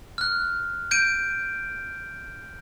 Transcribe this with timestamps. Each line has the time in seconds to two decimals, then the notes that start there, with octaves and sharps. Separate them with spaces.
0.18 F6 F#6
0.91 G6 D7 D#7